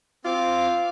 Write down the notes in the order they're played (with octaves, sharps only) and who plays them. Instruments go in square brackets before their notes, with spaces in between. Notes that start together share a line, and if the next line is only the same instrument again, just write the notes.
[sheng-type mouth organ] C4 D6 [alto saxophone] F4 [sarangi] F5